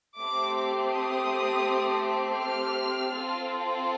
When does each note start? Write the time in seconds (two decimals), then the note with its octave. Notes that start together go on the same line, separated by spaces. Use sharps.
0.18 A3 C4 G4 D6
0.92 D#6
2.40 F6
3.13 C4 F4 A4